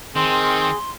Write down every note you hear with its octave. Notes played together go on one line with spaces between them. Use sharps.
D#3 C4 G#4 C6